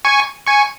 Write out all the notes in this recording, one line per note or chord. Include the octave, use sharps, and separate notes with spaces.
G#5 C#6
G#5 C#6